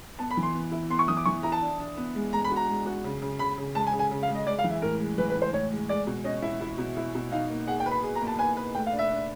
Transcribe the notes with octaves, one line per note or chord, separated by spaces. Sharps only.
B3 A5
B5
E3
C6
B3
E4
B3 C6
C#6
E3 D#6
D6
E3 C#6
E4 A#5
A5
D4
D4
B3
G#3
G#3 A#5
B5
F#4
A#5
G#3
F#4
C#3
C#3
C#3 B5
C#3
G#3 A5
G#5
C#3
G#5
C#3
F5
G#3
D#5
G#3 D5
F5
E3
E5
A2 A#4
G#3
E3 B4
B4
A2
C5
A2 C#5
G#3
G#3 D5
B2
C#4 D#5
E4 E5
E4
B2
E4
B2
D#4 F5
A#3
G#4 F#5
G5
B4
B5
G#4
A#5
A#3
A5
B4 G#5
B4
A3 G5
F5
D4
E5
D4